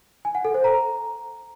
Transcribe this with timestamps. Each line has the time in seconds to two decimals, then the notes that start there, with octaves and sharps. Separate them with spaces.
0.25 G#5
0.35 F#5
0.45 A4
0.54 C5
0.64 A#5